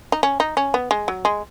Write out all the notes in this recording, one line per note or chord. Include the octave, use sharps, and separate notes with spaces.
D#4
C#4
D#4
C#4
B3
G#3
F#3
G#3